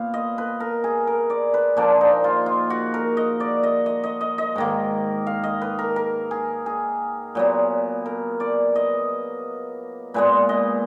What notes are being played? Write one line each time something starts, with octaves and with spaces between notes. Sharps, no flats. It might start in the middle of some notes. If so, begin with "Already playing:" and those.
Already playing: A#2 B3 F5
D#5
B4
A#4
G#4
A#4
D5
B4
A#2 F3 A#3 D4
D#4
F4
F4
F#4
A#4
D#5
D5
D#5
D#5
D#5
D#5
D#5
G#2 D#3 A#3
F5
D#5
B4
A#4
A#4
G#4
G#4
A#2 F#3 B3
A#4
D5
D#5
A#2 G#3 B3 B4
D#5